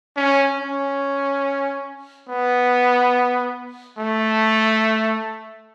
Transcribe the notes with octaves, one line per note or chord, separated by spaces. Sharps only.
C#4
C#4
B3
A3